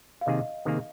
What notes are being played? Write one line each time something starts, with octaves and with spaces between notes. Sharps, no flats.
F5
C3 D#3 A#3 G#4 D#5
C3 D#3 A#3 G#4